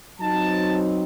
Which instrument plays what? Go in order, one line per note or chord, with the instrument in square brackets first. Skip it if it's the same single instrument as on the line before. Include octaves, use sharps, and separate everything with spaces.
[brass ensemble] F#3 C4 D#4 A5